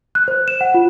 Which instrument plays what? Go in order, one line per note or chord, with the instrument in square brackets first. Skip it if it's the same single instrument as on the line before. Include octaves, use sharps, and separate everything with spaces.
[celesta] F#6
C5
E7
F#5
F4